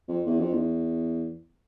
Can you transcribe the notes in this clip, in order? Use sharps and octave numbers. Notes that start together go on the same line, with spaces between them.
F2
E2
F2
E2